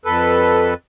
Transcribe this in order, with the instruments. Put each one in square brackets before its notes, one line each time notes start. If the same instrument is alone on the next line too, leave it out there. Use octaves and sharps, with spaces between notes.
[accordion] F2 A4 B4